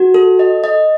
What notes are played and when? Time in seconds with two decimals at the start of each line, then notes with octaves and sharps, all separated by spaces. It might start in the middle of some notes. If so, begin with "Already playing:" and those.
Already playing: F#4
0.14 A4
0.39 D#5
0.64 D#5